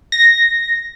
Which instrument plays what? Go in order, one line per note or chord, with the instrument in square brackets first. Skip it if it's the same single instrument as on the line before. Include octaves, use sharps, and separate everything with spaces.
[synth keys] A#6